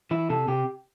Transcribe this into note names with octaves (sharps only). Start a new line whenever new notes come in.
E3 E4
C3 A4
C3 G4